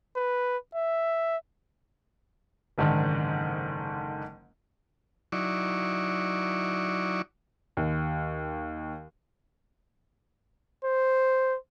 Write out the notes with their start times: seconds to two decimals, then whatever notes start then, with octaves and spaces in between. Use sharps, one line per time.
0.16 B4
0.75 E5
2.78 F#1 G#2 D3 D#3
5.32 F#3 D#4 E4 D5 C#6
7.77 D#2
10.85 C5